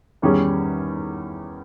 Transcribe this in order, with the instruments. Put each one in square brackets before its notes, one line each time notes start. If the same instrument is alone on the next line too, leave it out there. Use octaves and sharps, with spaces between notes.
[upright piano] E2 D#3 G3 C#4 G#4